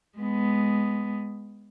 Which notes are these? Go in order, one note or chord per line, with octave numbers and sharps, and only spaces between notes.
G#3 B3